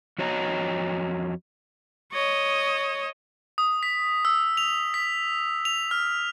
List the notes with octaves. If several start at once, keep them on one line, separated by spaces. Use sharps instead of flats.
F2 F#4 C#5 D#5 A5 A#5
C#5 D#5
D#6
B6
E6
F7
B6
F7
F6